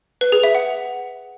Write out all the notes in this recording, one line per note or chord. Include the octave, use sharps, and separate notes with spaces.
B4
G#4
E5
F#5